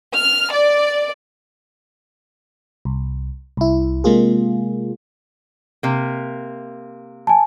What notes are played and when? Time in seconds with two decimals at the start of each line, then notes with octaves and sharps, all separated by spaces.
0.14 F6
0.52 D5
2.85 C2
3.57 C2 E4
4.04 C3 G#3 A#3 F4 G#4
5.83 C3 A#3
7.27 G#5 A5